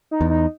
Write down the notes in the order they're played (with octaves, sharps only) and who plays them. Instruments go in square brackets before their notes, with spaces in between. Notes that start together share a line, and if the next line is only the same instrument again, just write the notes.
[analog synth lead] D#4
[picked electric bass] E2
[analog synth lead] D#4